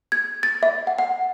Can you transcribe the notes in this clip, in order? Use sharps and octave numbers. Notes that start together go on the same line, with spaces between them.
G#6
A6
E5
F#5
F#5